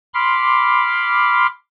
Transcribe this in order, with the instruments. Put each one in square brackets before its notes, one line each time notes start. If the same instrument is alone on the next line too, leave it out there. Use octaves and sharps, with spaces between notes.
[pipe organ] B5 C6 D6 F6